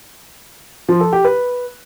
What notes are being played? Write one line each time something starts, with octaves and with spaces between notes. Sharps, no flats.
F3
A4
G4
B4